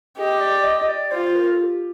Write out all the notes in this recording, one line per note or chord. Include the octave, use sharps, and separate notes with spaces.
G4 D#5
D5
D#5
D#5
D5
F4 C5
A#4
A4
G4